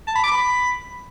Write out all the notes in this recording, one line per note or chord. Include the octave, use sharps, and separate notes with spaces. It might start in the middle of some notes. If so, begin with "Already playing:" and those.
A5
B5
D6
B5